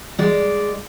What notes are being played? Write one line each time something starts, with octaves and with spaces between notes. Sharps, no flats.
G#3 D5